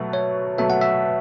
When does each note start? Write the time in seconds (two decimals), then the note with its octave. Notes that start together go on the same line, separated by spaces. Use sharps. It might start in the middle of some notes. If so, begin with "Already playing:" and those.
Already playing: B2 F#3 A3 E5
0.13 C#5
0.58 B2 F#3 A3 E5
0.70 F#5
0.81 E5